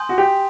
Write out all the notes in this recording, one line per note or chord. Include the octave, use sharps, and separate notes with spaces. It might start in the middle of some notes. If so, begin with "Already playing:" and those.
Already playing: G#5 C6 D#6 G6
F#4
G4